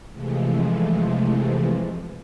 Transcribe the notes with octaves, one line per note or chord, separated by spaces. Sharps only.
C3 E3 F3 G#3 A3